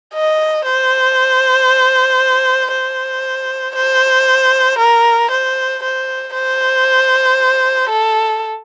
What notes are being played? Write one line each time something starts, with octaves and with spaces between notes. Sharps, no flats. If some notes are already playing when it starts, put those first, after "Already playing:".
D#5
C5
C5
C5
A#4
C5
C5
C5
A4